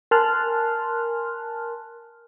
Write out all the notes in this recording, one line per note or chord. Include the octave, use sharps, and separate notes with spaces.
A#4 G#5 A5 C6 F6 F#6